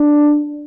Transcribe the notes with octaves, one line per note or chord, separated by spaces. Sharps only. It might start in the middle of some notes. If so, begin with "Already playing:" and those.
Already playing: D4